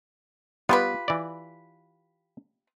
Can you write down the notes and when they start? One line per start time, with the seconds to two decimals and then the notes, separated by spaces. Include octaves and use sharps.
0.69 G3 B3 F4 G4 B4
1.08 E3 D5